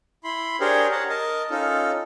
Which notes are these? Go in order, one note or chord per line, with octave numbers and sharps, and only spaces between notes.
E4 B5 C6
D4 G4 G#4 A#4 C5 C#5
C#5 F#5 A5 A#5
A#4 D#5 A5
C#4 D#4 F4 A4